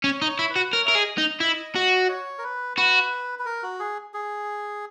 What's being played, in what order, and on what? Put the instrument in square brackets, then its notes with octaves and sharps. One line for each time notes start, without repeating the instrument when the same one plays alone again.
[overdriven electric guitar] C#4 [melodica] C#5
[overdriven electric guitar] D#4 [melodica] D#5
[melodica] C#5
[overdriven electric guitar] E4
[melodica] B4
[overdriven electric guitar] F#4
[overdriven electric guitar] A#4 [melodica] C#5
[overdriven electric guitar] A#4 [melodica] E5
[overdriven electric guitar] G#4 [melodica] D#5
[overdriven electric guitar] D#4 [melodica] D#5
[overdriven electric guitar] E4
F#4
[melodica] C#5
A#4
B4
[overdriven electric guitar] F#4 [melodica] B4
[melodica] B4
A#4
F#4
G#4
G#4